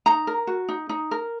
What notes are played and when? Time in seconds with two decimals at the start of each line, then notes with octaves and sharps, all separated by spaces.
0.06 D#4 A#5
0.27 A#4
0.47 F#4
0.69 D#4
0.89 D#4
1.11 A#4